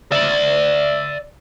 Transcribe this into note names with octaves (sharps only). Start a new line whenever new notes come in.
D5 E5